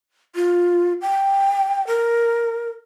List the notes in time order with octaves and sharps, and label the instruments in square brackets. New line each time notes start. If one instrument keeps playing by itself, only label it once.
[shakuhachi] F4
G5
A#4